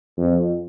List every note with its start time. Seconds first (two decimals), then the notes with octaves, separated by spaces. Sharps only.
0.18 F2